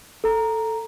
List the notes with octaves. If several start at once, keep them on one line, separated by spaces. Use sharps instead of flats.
A4 A#5